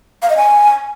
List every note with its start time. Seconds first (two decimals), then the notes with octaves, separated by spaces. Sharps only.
0.23 F5
0.30 D#5
0.37 G#5